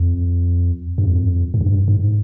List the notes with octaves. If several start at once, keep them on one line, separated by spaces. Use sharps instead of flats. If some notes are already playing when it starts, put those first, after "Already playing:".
Already playing: F2
G2
F2
G#2
G2
G#2